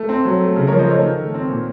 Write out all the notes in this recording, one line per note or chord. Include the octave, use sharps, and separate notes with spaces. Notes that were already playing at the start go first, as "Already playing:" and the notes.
Already playing: A3
C4
F#3
A3
C#3
F3 A#4 C#5
C5 D#5
A3 A#4 C#5
D#3
A3
C4
A#2